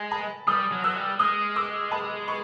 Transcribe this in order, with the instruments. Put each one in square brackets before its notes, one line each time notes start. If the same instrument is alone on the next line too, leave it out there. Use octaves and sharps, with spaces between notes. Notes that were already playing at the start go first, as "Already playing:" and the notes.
Already playing: [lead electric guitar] G#3 [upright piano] G#5
[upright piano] A5 B5
[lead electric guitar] G3 [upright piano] D#6 F6
[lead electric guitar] F#3
[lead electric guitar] F#3 [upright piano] E6 F#6
[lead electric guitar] G3
[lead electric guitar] G#3 [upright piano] D#6 F6
[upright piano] D6 E6
A5 B5
B5 C#6